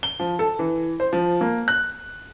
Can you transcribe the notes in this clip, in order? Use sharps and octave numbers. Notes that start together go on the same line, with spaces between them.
G7
F3
A4
E3
C5
F3
A#3
F#6